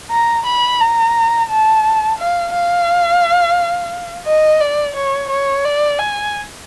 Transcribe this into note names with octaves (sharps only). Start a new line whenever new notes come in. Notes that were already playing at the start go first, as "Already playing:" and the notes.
A#5
B5
A#5
A5
F5
F5
D#5
D5
C#5
C#5
D5
G#5